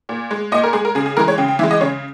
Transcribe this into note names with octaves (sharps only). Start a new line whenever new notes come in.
A#2
G#3
A#2 D#5
A#4
G#3 G#4
A#4
C#3 G#4
G#4
E3 G#3 A#4
C#5
C#3 G5
G5
E3 G#3 E5
D#5
C#3 C#5